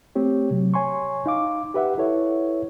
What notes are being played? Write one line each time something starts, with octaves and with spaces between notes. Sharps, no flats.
A3 C4 G4 C#5
C3 F#3
C#5 G#5 C6 C#6
D#4 F5 D6
G4 B4 E5 F#5
E4 A4 B4 C#5 E5